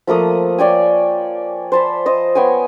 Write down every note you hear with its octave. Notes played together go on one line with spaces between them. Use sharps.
F3 A3 A#3 D#6
C#5 D5 G5 G#5
C5 A5 B5
C5 D#5
B3 C#5 G5 G#5